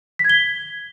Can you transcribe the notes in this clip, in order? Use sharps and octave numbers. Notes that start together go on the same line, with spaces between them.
B6
G#6
G7